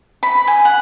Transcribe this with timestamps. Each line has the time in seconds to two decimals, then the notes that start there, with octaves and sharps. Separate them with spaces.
0.23 B5
0.47 G#5
0.65 F#5